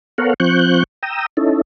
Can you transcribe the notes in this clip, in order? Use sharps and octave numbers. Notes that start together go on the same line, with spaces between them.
B3 A4 A#4 C#5 F5 F#5
F3 C4 C#6 F#6 G6
G5 A#5 D#6 E6
C#4 D#4 E4 A4